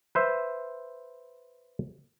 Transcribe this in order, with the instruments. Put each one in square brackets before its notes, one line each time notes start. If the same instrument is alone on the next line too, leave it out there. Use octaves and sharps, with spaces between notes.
[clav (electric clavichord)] B4 C5 E5